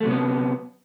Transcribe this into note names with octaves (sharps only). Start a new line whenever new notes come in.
C3 F#3 A3 B3 C#4